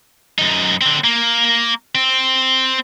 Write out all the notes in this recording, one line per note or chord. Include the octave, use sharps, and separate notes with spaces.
F#2 D#4
D3 C4
A#3
C4